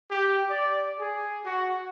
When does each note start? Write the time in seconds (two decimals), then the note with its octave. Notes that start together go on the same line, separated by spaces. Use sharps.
0.11 G4
0.50 D5
0.99 G#4
1.44 F#4